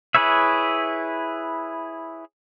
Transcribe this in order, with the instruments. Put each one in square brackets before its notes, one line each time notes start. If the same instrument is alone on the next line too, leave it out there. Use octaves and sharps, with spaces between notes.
[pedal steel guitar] E4 G#4 B4 C#5 E5